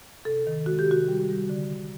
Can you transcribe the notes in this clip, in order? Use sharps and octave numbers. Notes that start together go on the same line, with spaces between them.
C3 A4
D#3
G#3 F#4
G4
C3 F#4
G3
G3
D3
D3